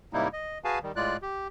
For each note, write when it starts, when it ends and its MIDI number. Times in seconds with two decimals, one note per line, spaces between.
0.13 0.28 44
0.13 0.28 48
0.13 0.28 55
0.13 0.28 58
0.13 0.28 63
0.13 0.28 64
0.33 0.58 75
0.64 0.79 66
0.64 0.79 68
0.64 0.79 71
0.64 0.79 77
0.64 0.79 80
0.64 0.79 81
0.83 0.92 51
0.83 0.92 55
0.96 1.17 45
0.96 1.17 56
0.96 1.17 65
0.96 1.17 74
0.96 1.17 90
1.22 1.48 67